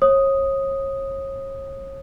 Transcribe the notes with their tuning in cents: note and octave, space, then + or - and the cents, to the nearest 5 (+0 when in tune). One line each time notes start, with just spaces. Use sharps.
C#5 -35 D#6 +0